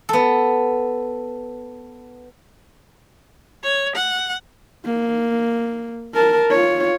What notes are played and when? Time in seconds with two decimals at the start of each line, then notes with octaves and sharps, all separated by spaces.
0.09 B3 A4
3.63 C#5
3.96 F#5
4.85 A#3
6.14 A#4 A5
6.51 F4 C#5